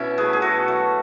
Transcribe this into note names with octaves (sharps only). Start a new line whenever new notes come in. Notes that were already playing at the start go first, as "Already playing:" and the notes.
Already playing: B2 C#4 E4
F#3 A3 G#4 B4
G#4
B2 F#4 A4
F#3 A3